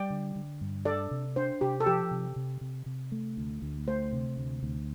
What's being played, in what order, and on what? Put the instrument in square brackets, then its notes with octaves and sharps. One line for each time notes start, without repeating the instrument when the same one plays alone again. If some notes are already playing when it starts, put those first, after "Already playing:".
Already playing: [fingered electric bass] G3 [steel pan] D5 G5
[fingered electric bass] D3
D3
G2
[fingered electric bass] D4 [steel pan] A4 D5
[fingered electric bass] C3
[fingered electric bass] D4 [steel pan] C5
[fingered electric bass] C3 [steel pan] G4
[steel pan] A4
[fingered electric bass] F3 [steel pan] G4
[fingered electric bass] C3
C3
C3
C3
A3
D2
D2
[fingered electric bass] A3 [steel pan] C5
[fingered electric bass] C3
D2
D2